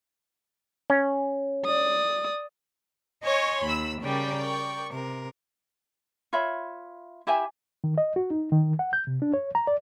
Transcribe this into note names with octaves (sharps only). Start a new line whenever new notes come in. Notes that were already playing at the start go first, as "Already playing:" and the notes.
C#4
D5 D#6
C#5 D#5 G#5 C6 C#6
D#2 B5 E6
C#3 G3 A#4 D5 G5
C#6
C3 A#4
F4 C#5 E5 B5
E4 G4 E5 G#5
D#3
D#5
F#4
D#4
D#3
F#5
G6
C3
D4
C#5
A#5
D5